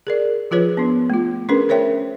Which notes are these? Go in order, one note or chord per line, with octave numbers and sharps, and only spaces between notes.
G#4 A#4 D5
F3 F4 G#4 B4 C#5
B3 D4
A3 F4
C#4 D4 G#4 A#4 B4
A#4 C5 C#5 E5 G5